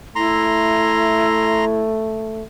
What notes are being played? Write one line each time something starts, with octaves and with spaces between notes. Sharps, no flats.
A3 E4 A#5 C6